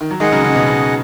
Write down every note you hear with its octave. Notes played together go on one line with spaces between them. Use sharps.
D#3
F#3
D#3 G#3 G#4 D#5 F#5
C#3 F#3
C#3
B2
C#3